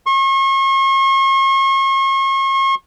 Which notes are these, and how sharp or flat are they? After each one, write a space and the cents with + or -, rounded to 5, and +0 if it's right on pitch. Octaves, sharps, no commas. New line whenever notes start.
C#6 -40